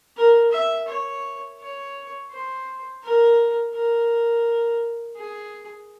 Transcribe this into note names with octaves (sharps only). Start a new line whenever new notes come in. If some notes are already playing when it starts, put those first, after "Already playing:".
A#4
E5
C#5
C#5
C5
A#4
A#4
G#4